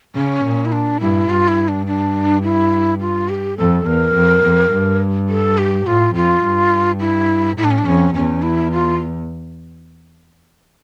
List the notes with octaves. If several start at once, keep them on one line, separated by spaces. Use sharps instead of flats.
C#3 C#4
A#2
E4
D4
G2 E4
G2 F4
E4
D4
D4
E4
F4
G4
F2 A4
E2 A#4
F2
F2
G2
A4
G4
A2 F4
F2 F4
G2
E4
A2 E4
D4
C#4
D4
F2 C#4
E2 C#4
E4
F4